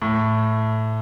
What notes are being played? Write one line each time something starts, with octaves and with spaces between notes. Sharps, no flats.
A2